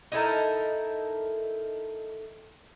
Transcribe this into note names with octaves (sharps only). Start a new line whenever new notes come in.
D#4 E4 A4 A#4